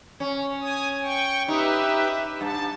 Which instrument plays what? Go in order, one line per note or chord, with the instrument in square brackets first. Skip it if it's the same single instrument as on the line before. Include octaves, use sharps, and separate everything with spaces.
[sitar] C#4
[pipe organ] G#5 D#6
G5 C#6
[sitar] D#4 [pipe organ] G4 B4 E5
[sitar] G2 [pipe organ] A5